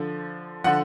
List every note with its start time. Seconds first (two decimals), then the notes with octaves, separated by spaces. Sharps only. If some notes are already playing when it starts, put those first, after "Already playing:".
Already playing: D3 F3
0.64 D3 F3 F#5